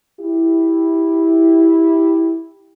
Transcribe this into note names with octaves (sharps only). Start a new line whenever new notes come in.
E4 G4